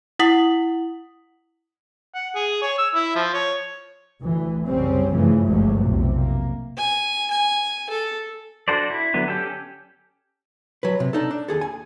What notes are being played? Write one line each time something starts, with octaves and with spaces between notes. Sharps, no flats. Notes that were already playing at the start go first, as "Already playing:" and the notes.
E4 F#5 D#6 B6 F#7
F#5
G#4
C#5
E6
E4
F3
C#5
D2 E3
F#1 C2 C#3 G3 C4 C#4
G2 C#3 E3 F3 A3
G1 C#2 G2 F3 F#3 A3
F1 B1 C3
A#3
G#5
G#5
A4
D4 F#4 A4 C5 D5
E4
D3 F#3 B3 D4
C#4 G4 A4
F#3 B4
C3
D4 D#4 A4
D4
D#2 G#4 A4
G#5